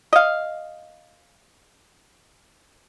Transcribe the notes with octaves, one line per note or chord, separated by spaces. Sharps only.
D#5 F5